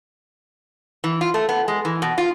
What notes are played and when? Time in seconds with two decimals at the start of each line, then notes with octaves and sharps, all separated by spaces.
1.04 E3
1.21 F4
1.34 A3
1.49 B3
1.68 G#3
1.85 E3
2.02 B2
2.18 F4